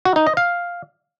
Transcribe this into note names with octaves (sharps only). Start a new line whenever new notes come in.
F#4
D#4
D#5
F5